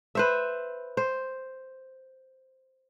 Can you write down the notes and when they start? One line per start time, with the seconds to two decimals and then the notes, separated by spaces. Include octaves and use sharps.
0.15 B4 C5 E5
0.97 C5